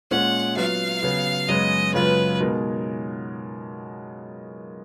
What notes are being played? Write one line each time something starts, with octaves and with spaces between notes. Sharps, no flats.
A#2 G#3 C#4 F#5
F#3 B3 F4 F5
C#3 F#3 B3
F#2 C#3 G#3 B3 D#5
F#2 C#3 G#3 B3 F4 B4
B2 G#3 D#4 A#4